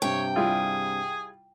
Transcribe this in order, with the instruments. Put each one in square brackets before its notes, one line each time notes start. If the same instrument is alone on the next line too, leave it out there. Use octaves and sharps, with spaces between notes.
[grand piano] G2 C3 [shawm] C#5 [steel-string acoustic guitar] G5
[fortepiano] G3 E4 F4 [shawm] G#4